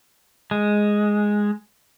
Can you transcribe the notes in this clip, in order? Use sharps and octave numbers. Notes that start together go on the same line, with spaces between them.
G#3